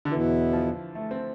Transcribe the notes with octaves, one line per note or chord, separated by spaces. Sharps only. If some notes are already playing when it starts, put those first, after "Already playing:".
D3
E2 B2 E3 B3 E4
F3
A3
C4